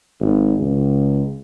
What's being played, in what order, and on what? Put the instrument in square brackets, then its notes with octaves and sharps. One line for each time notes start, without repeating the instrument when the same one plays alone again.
[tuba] G#1
C#2